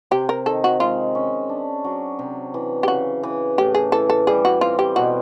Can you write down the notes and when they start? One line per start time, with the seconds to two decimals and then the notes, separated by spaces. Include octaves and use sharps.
0.11 C3 G4
0.29 A#4
0.46 D#3 A4
0.64 F#4
0.80 G#3 F4
1.15 C#4
1.49 D4
1.84 F#3
2.19 C3
2.54 E3
2.83 G4
2.88 C#3 F#4
3.23 E3
3.58 A2 G4
3.75 G#4
3.92 E3 A4
4.10 A4
4.27 G3 G#4
4.45 F#4
4.61 C4 F4
4.79 G4
4.96 B2 F#4